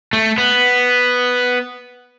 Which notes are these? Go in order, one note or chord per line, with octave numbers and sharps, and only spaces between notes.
A3
B3